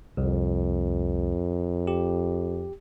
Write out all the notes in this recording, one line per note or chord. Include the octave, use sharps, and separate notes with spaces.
C2 F2
G4